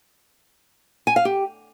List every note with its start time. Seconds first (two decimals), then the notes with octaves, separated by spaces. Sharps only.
1.07 G#5
1.16 F5
1.25 G4